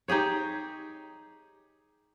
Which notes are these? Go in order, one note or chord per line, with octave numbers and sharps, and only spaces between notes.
D#4 G4 G#4 C#5